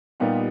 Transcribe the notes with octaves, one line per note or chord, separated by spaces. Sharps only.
A#2 G3 B3 D#4 F4 G4